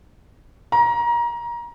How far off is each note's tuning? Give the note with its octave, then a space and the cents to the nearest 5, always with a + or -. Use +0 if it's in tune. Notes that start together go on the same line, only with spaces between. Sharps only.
A#5 +25